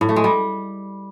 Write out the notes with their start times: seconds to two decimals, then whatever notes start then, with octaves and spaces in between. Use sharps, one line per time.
0.01 A2
0.09 A3
0.16 G#3
0.24 G3